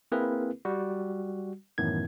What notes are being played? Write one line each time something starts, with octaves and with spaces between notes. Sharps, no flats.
A#3 C4 E4 G#4 A#4 B4
G3 F#4
F#2 A2 D#3 E3 B3 G#6